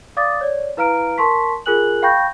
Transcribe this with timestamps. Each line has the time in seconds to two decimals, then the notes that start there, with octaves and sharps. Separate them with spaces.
0.17 D5 F5 D6 D#6 A6
0.41 C#5 D5
0.77 E4 B4 F5 A#5 F6 D7
1.18 A#4 A5 C6 C#6 B6
1.66 F4 G#4 A#4 G#5 F#6 F#7
2.02 F5 G5 B5 C#6 G6 A#6